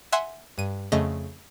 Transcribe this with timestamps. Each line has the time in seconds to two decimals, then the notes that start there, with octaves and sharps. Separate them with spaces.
0.12 E5 F#5 G#5 C6
0.58 G2 D#7
0.92 F2 C#3 A3 D#5 A#6